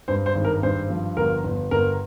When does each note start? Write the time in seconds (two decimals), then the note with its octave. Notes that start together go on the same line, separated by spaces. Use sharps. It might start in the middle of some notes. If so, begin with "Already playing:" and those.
0.08 G2 C5
0.26 C5
0.35 G#1
0.45 A#4
0.63 G2 C5
0.90 F3
1.17 G1 A#4
1.44 G1
1.71 G1 A#4